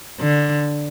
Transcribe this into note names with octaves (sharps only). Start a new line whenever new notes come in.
D3